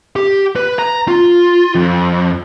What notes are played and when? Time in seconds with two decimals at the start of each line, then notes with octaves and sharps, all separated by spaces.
0.16 G4
0.56 B4
0.79 A#5
1.08 F4
1.75 F2